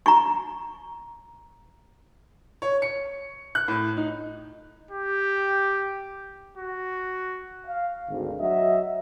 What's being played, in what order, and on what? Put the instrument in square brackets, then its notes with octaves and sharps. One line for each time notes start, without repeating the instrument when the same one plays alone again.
[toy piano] A#5 C#6
[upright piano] C#5
C#7
F#6
A2
D#4
[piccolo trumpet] G4
F#4
[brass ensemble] F5
G#1 D2
F#3 F#4 D#5 E5